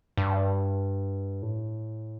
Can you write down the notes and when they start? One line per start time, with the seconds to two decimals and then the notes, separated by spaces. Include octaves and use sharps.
0.17 G2
1.42 A2